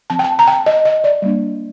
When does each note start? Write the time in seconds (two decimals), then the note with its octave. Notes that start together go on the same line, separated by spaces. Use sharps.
0.10 F3 C4 A5
0.19 G5
0.24 A5
0.39 A#5
0.47 G5
0.52 A5
0.66 D#5
0.85 D#5
1.04 D5
1.22 G3 A#3 D4